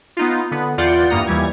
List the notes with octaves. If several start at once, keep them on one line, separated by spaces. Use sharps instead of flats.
B3 D#4 F4
D3 B3
E2 F4 D5 F#5 G6
E2 G2 A#3 A#5 D#6 C#7
D#2 E3 G3 G#6